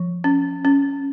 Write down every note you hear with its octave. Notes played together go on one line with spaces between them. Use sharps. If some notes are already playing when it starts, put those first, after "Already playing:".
Already playing: F3
C#4
C#4